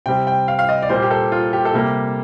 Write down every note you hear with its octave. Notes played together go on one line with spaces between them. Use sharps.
C3 G3 C4 G5
G5
F5
F5
D#5
D5
A#2 G3 A#3 C5
G4
A4
F4
G4
A4
C3 G3 A#3 G4